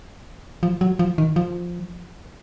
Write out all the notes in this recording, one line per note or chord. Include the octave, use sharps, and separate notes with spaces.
F3
F#3
F3
D#3
F3